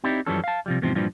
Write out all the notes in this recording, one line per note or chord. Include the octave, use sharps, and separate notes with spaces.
C4 D#4 E4 G4 D5
F#2 E3 F3 G3 C#4 A4
F5 A5
C3 F3 G3
E2 G#2 C3 F3 C4
G2 A#2 E3 F3 G3